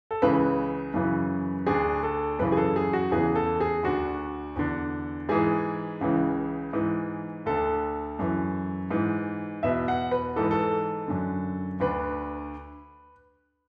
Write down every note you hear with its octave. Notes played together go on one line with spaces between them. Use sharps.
A4
C#2 C#3 E3 B4
F#2 C#3 E3
D2 D3 G#4
A4
F#2 C#3 E3 B4
G#4
A4
G#4
F#4
E2 C#3 E3 G#4
A4
G#4
D2 D3 F#4
E2 D3
G#2 E3 G#4
C#2 C#3 E3
G#2 E3
D2 D3 A4
F#2 E3
G#2 E3
E2 B2 E5
F#5
B4
G#2 E3 A4
B4
A4
F#2 D3
D2 D3 B4